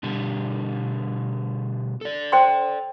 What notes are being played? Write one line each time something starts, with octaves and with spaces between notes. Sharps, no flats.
B2 D3 G3
A4 D5
C5 G5 C6